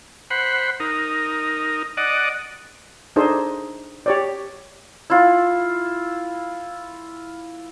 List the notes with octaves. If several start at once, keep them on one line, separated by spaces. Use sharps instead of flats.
C5 F#5 B5
D#4 A#4
D5 D#5 F#5
D4 D#4 G#4 A4 C5
G4 C#5 D5
E4 F4